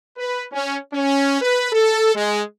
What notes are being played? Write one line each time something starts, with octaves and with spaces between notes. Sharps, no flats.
B4
C#4
C#4
B4
A4
G#3